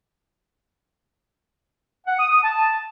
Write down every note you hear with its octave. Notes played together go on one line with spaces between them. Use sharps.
F#5
D#6
D#6
A5